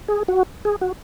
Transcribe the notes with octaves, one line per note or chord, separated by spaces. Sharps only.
G#4
F#4
G#4
F#4